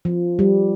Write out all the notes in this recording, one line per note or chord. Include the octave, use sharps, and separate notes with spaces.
F3
G3